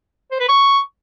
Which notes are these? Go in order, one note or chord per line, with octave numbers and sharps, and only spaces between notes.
C5
B4
C#6